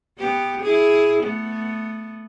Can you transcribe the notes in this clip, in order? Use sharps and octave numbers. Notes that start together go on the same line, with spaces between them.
B3 G4
E4 G#4
A3 B3